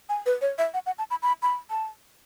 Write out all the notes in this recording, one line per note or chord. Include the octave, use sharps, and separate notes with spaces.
G#5
B4
C#5
E5
F#5
F#5
A5
B5
B5
B5
A5